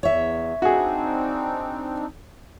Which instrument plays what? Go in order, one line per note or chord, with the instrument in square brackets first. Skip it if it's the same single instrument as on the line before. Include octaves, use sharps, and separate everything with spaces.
[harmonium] E2 [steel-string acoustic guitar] C#5 E5
[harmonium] C4 D4 D#4 [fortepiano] F#4 G#4